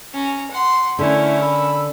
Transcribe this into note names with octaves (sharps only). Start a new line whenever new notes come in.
C#4 A#5
F#5 C6
D3 A3 C#4 E4 A#4
A4 B5 E6